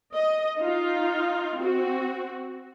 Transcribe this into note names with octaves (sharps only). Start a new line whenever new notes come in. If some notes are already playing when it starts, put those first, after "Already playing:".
D#5
D#4 F4
C4 F#4